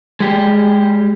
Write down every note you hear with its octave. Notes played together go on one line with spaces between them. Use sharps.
G#3 G4